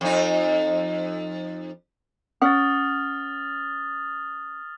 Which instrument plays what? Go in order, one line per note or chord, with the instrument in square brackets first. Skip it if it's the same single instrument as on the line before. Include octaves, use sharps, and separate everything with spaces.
[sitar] F2 D#4
[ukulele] C#4 F#5 [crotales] D#6 F6 A6